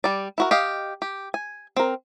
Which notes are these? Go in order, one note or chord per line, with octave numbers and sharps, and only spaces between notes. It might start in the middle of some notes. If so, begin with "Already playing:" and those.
G3 D5
E4 F#4 A#4
G4 D#5 F5
G4
G#5
C4 A#4